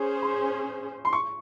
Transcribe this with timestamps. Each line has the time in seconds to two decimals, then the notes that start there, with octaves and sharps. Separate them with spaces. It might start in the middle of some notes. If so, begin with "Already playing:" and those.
Already playing: C#4 G#4 C5
0.22 C6
1.05 C6
1.13 C#6